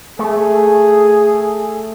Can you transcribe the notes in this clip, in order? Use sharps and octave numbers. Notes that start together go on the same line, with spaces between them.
A3 G#4